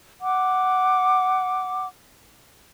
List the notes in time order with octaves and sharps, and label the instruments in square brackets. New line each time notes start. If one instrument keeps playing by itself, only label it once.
[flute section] F#5 D6